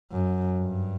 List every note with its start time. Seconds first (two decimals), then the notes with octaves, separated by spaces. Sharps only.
0.12 F#2
0.59 G2